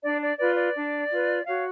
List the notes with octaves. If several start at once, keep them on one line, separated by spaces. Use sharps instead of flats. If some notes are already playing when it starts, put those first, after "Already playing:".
D4 D5
D5
F4 B4 D5
D5
D4
F4 B4
F#4 C#5 F5